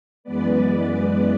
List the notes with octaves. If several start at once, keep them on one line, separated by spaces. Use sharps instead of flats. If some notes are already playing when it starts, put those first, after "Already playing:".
F#2 E3 G#3 B3 B4 D5